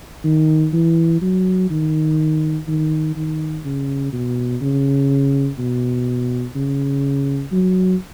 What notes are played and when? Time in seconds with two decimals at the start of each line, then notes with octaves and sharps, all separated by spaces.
0.24 D#3
0.73 E3
1.22 F#3
1.70 D#3
2.68 D#3
3.16 D#3
3.65 C#3
4.13 B2
4.62 C#3
5.59 B2
6.56 C#3
7.52 F#3